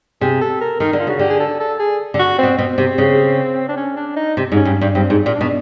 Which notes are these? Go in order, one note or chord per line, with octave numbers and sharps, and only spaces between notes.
C3 G#4
A4
A#4
D#3 A#4
D3
F4
C#3 F#4
D3 G4
G#4
A4
A4
G#4
D3
F#4
B2 C4
B2 C4
C3
C#3
D4
C#4
D4
D#4
C3
G#2
C#4
G2
G2
G2 C4
G#2
A#2
D4
B2